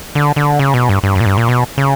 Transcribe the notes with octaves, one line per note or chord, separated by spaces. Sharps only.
D3
D3
C#3
B2
G2
G2
F#2
A#2
G2
A#2
B2
C#3